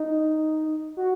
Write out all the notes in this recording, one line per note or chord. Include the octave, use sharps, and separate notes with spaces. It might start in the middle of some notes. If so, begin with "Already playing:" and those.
Already playing: D#4
F#4